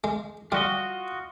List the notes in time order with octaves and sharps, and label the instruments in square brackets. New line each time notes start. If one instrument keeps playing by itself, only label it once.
[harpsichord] G#3
[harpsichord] G3 [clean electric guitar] F4 F#4 D#5